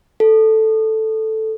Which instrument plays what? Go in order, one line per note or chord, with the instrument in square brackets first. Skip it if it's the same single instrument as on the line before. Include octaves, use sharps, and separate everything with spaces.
[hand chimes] A4